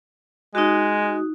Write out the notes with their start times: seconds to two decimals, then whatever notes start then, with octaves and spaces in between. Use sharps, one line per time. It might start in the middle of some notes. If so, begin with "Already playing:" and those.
0.55 G#3 D#4 F#4